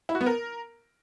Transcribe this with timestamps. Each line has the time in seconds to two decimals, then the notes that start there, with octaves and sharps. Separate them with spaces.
0.09 E4
0.15 F#4
0.21 B3
0.26 A#4